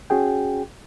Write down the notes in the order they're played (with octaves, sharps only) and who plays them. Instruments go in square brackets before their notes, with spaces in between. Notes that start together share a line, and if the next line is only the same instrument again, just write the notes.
[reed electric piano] C#4 F#4 G#4 G5